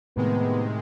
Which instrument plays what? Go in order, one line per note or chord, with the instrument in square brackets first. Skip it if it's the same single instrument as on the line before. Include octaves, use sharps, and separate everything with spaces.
[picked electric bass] A2 [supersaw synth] C3 D#3 G#3 [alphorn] B3